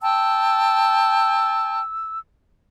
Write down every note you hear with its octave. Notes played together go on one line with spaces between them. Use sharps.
G5 A5 E6